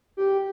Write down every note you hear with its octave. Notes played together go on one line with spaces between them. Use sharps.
G4